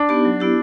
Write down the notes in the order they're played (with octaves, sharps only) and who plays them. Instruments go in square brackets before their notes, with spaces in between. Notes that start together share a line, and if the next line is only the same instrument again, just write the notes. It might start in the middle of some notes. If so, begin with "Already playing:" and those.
Already playing: [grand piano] D4
[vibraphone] B3 D#4 G4
F#3
B3 E4 G4